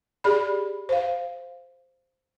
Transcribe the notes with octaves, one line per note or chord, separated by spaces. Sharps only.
G4 G#4 D5 B5
C5 F5